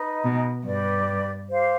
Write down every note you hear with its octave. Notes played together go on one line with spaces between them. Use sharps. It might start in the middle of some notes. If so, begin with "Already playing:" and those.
Already playing: D#4 B4 D#5 B5
B2
G2 G4 B4 D5
G4 C5 F5 C6